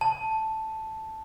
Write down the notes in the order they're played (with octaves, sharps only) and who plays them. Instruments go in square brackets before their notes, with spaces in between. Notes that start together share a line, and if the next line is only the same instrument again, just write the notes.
[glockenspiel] A5